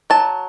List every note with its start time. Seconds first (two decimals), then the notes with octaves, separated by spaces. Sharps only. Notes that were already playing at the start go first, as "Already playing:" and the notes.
0.10 F#3 A5